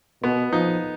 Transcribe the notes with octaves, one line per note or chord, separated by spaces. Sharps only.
B2 B3
F3 D#4